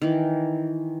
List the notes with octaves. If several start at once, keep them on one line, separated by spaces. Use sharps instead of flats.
D#3 E3